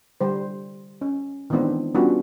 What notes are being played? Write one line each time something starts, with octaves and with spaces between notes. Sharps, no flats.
D3 G3 C5
C#4
D#3 E3 G#3 B3 C4 D4
G3 B3 C#4 D4 F4 F#4